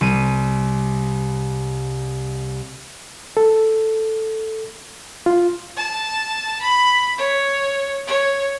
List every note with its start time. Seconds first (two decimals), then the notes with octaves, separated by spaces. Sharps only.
0.01 C2 D#7
3.37 A4
5.26 F4
5.76 A5
6.61 B5
7.18 C#5
8.07 C#5